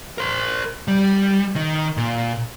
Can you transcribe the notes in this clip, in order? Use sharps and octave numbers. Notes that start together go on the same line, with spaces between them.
A#4 C5
G3
D#3
A#2